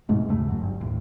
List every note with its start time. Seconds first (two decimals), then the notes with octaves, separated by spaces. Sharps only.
0.09 G#2 B2 G#3 A3
0.28 D#2 G#2 C#3 A3
0.49 F#2 F#3
0.61 G1
0.81 D#2 A2